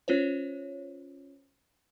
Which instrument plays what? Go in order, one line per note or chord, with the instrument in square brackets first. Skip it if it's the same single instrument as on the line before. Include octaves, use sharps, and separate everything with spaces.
[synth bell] C#4 F4 C5 C#5